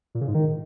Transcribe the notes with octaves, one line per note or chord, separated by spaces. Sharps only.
A#2
C#3
G#2
D#3